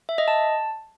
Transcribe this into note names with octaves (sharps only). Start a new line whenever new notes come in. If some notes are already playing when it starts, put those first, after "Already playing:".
E5
D#5
A5